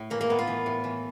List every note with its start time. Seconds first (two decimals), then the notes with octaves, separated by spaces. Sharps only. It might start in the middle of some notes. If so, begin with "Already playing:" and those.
Already playing: A2
0.10 E3 A#3
0.21 A#3
0.29 A2 B3
0.39 F4
0.47 E3
0.66 A2
0.84 E3